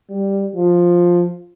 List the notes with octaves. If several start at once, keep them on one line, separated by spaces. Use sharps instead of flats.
G3
F3